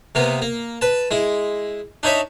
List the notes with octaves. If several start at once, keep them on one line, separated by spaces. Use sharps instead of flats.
C3 A#3 B3
A#3
B4 A5
G#3 E4
D4 D#4 C#5 E5 B5